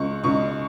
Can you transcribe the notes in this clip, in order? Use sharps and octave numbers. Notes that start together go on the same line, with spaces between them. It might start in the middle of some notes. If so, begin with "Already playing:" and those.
Already playing: C#2 C#6
C#2 C#6